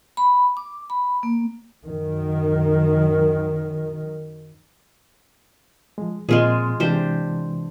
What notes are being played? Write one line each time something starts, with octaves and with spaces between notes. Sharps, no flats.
B5
D6
B5
A#3
F#2 D#3
F3 G#3
A#2 F3 G#3 C4 F4 G#4
C3 E3 G#3 D4 G4 C5